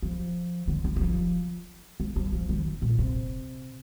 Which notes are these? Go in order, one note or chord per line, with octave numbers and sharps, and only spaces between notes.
F3
D3
D#3
D#3
F3
G#3
G3
F3
D#3
A#2
C3